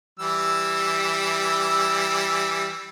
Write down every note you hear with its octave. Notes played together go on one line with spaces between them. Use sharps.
E3 G3 E6